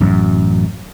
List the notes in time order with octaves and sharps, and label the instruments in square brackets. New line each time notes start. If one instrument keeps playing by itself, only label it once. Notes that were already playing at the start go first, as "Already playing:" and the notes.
[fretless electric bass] A1 F#2